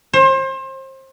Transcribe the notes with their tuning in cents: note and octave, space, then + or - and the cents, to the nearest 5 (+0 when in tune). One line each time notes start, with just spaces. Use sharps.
C5 +30